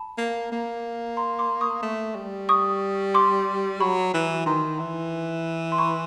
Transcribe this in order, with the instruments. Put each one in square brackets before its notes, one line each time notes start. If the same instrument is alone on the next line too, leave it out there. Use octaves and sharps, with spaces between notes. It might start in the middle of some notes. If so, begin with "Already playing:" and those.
Already playing: [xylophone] A5 B5
[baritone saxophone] A#3
A#3
[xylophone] A#5 C6
C6 D6
C#6 D#6
[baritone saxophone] A3
G3
[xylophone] C#6 D#6
C6 D6
[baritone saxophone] F#3 [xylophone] B5 C#6
[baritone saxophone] E3
[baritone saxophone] D#3 [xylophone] A#5 C6
[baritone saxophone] E3
[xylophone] C6
B5 C#6